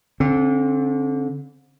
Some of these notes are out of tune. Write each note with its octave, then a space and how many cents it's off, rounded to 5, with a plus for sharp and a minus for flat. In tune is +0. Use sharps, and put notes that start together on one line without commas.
D3 -25 C4 +30